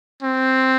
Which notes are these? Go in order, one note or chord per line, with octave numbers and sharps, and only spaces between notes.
C4